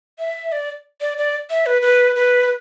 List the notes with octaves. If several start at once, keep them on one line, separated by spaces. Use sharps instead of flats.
E5
D5
D5
D5
E5
B4
B4
B4